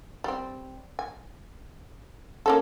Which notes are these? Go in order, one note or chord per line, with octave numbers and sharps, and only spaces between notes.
G3 C4
G#5
A#3 C#4 A4